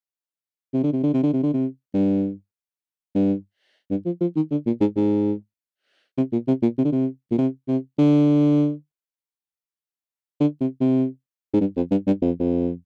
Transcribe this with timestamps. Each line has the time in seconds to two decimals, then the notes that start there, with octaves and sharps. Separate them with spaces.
0.73 C3
0.83 D3
0.93 C3
1.03 D3
1.13 C3
1.23 D3
1.33 C3
1.43 D3
1.53 C3
1.94 G2
3.15 G2
3.90 G2
4.05 F3
4.21 F3
4.36 D#3
4.51 D3
4.66 A#2
4.81 G#2
4.96 G#2
6.17 C3
6.32 A#2
6.48 C3
6.62 A#2
6.78 C3
6.85 D3
6.92 C3
7.31 A#2
7.38 C3
7.68 C3
7.99 D3
10.40 D3
10.61 C3
10.81 C3
11.54 G#2
11.61 G2
11.76 F2
11.91 G2
12.07 G2
12.22 F2
12.39 F2